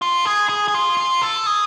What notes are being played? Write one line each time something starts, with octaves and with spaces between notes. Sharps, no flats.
F4
G#4
G#4
G#4
F4
F4
A4
G#4